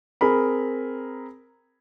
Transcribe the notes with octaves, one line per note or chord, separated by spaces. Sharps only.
C4 G#4 A#4 B5